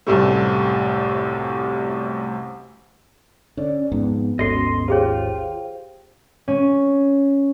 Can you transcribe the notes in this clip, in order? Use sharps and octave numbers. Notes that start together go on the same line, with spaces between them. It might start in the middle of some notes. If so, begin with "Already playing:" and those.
C2 F#2 A2 C3 G3 A3
D3 C#4 D5
F2 G#2 B3
G#1 D#2 C#4 F#4 A4 D#5 C6
F4 G4 G#4 C5 C#5 F5 G5
C#4